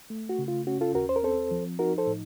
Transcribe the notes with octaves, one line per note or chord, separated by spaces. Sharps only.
A3
F#4
C#3
F4
C#4 F#4
F4 A4
D#2 F#4 A#4
C5
A#4
C4 A4 C5
F3
D#4 F#4 A#4
A4 C5
A2